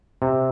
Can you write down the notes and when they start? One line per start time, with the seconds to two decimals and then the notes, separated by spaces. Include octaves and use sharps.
0.22 C3